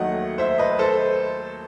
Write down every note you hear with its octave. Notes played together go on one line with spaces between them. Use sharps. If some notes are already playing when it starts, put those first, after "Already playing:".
Already playing: D#2 D#3 F#3 A3 D#5 F#5
C5 E5
B4 D#5
A4 C5